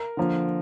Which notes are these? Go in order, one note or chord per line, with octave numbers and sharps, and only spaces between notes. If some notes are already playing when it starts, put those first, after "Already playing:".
Already playing: A#4
D3 F3 A#3